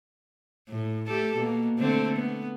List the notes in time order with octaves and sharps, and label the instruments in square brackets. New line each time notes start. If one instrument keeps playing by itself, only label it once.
[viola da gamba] A2
A3 G4 A4
B2 A#3
D3 A3 C4
B3